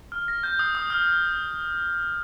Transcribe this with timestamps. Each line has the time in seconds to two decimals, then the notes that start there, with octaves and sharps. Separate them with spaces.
0.12 F6
0.28 A#6
0.43 G6
0.59 D#6
0.75 D#6
0.90 F6